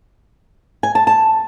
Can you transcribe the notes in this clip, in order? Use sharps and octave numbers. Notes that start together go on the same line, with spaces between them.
G#5
A5
A5